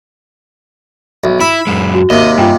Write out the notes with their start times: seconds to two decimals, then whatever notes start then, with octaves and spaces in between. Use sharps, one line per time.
1.24 B1 F#4 E5
1.41 E4 B5 E6 E7
1.67 F#2 G#3
1.94 F#4
2.10 D#2 C3 D#5
2.38 G2 F4 G5 G#5